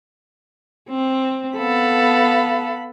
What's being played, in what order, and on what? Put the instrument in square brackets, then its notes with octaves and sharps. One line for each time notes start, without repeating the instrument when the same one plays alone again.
[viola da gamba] C4
[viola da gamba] B3 A4 [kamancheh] F5 B5